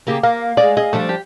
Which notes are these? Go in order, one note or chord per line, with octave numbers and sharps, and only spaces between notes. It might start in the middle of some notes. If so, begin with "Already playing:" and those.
C#3 A#3 G4
A#3 F5
G#3 G#4 D5
G#4 D#5
F3 G3 A3 D4
G4